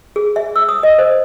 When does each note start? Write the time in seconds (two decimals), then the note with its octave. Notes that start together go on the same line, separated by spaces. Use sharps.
0.16 G#4
0.36 E5
0.56 E6
0.69 D#6
0.83 D#5
0.99 C5